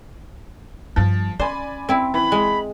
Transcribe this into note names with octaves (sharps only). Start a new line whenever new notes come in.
G2 F3 G3
C#4 C5 D5 G#5 B5
C4 E4
E3 B5
G#3